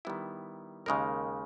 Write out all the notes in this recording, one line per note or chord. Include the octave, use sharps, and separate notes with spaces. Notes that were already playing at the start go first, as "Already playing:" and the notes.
D#3 G3 B3 E4
D#2 C#3 G#3 D#4 A#4